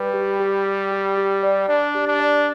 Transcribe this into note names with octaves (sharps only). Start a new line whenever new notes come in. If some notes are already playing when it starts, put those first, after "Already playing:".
Already playing: G3 B4
G4
G4
G4
G4
G4
D5
D4 D5
G4
D4
D5